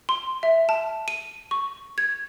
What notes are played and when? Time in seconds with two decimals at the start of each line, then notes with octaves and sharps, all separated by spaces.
0.09 C6
0.43 E5
0.69 A5
1.08 D#7
1.51 C#6
1.98 G#6